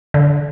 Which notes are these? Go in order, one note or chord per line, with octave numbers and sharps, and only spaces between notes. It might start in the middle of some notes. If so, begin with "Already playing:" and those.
D3